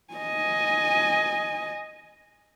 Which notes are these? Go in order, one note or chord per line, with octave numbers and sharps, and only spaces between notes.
D#5 G#5